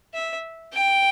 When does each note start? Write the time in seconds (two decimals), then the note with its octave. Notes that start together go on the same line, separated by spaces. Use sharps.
0.14 E5
0.73 G5